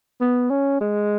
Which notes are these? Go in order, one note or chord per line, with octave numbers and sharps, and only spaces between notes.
B3
C#4
G#3